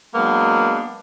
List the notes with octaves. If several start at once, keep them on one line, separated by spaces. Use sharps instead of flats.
F#3 G#3 A#3 B3 D4